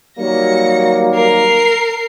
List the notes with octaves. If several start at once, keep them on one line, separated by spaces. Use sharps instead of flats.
D#3 F#3 G3 A#3 A#6 C#7
A#4 C7